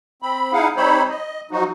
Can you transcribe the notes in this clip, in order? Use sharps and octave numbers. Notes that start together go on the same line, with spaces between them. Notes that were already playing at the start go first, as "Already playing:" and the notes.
C4 B5
D#4 E4 G#4 F5 F#5
G3 C4 D#4 C5 C#5 B5
D#5
F3 F#3 D#4 F#4